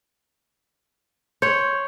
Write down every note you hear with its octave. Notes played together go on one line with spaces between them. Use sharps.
C#5 C6 G6